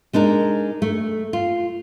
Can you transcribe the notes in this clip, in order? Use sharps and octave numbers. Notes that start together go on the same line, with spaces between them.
G#3 D4 D#4 A#4
A3
F4